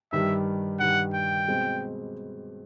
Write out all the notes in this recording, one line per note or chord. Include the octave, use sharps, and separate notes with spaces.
G2 D#3 G3 E5
G2 D#3 G3 F#5
G5
B2 G#3 C4